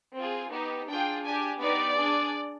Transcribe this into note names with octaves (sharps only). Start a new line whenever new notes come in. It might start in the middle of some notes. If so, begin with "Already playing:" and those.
C4 F4 G#4
B3 D#4 G4
D4 F4 G#4 G5
D4 G4 G#5
B3 D#4 G4 D5
D4 G#4